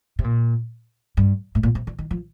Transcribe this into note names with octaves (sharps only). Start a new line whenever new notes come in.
C3
A#2
G2
A2
A#2
C3
D3
D#3
F3